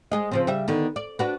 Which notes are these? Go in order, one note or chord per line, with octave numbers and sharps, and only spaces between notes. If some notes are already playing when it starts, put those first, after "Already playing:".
G#3 G#4 D#5
C#3 F3 C4
C#3 G3 E5
D3 D#3 B3
D5
D4 F#4 B4